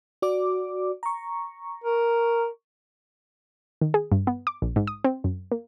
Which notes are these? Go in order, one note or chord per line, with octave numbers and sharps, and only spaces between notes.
F#4 D5 D6
A#5 C#6
A#4
D#3
G#4
G2
B3
D6
A#1
G#2
D#6
C4
F#2
A#3